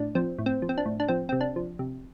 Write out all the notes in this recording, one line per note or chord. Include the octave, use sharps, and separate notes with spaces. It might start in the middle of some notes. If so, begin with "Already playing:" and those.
Already playing: A2 D4
F3 C4
A2
C4
F3
C4
D4
A2
D4
F3 C4
C3 C4
D4
F3
C3